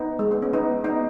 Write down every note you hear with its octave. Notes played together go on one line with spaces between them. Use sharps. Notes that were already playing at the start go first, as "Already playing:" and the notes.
Already playing: B3 D#4
G#3
B3
C#4
B3 D#4
B3 D#4